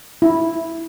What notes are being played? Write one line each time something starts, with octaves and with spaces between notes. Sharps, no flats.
E4